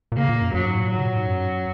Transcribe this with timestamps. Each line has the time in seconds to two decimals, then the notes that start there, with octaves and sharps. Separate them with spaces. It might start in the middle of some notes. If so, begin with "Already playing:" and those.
0.12 A#2
0.17 C#3 A#3
0.29 A#2
0.41 F#2
0.54 F#2 F#3
0.66 G#2
0.78 A#2
0.90 G#2 F#3
0.98 C#3
1.03 A#2
1.15 G#2
1.27 F#2